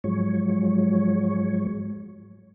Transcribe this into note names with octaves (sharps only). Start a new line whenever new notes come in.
G#2 F3 F#3 G#3 C#5